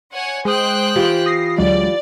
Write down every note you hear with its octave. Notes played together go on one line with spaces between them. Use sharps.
C#5 F#5 G#5
G#3 C5 G5 D#6 F#6
E3 F4 G4
D#6 A#6 C7
D2 F#3 G#3 D5